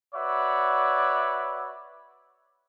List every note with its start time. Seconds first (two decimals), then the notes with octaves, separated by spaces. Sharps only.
0.14 F#4 B4 C#5 D5 E5